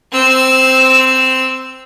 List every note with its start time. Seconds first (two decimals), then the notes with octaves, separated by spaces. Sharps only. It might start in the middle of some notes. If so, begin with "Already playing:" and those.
0.12 C4 E6